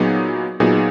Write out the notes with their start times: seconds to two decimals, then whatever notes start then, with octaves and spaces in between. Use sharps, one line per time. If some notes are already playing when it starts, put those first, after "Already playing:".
Already playing: A#2 F#3 B3 D#4 G#4
0.60 A#2 F#3 B3 D#4 G#4